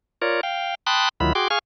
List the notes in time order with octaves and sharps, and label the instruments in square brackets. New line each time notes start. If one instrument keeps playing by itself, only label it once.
[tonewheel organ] F4 A#4 C#5 D5
F5 G5
G5 A5 B5 C6 D#6 F#6
D2 D#3 F#3 E4 F4 B5
F#4 G#4 G5 C6 D6
G#4 F5 G#5 C#6 F6